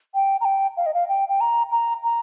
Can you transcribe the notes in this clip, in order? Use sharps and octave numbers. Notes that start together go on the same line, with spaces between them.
G5
A#5
G5
F5
D#5
F5
G5
G5
A#5
A#5
A#5